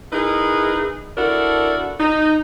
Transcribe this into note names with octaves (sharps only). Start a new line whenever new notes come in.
D#4 E4 G#4 A#4 B4
D4 E4 F#4 A4 A#4
D#4